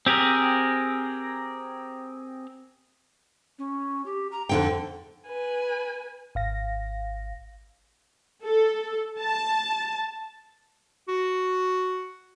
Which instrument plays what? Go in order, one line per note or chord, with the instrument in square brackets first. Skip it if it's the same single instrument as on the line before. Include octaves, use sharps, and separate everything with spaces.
[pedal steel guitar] C4 G4 G#4 A#4
[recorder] C#4
G4
A#5
[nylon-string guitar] F2 D3 G5 [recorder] D#4
[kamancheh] B4 G#5
[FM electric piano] G#1 F5 A#6
[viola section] A4
A5
[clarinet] F#4